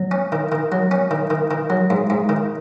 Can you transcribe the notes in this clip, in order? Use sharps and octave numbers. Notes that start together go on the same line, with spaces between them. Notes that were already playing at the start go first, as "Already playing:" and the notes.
Already playing: F#3
C#4
D#3
D#3
F#3
C#4
D#3
D#3
D#3
F#3
G#2
G#2
D#3